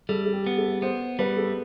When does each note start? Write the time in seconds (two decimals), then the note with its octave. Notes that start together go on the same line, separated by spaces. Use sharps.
0.09 G3 A4
0.26 A4
0.33 G4
0.47 B3
0.58 A4
0.82 B3 C5
1.19 G3 B4
1.37 A4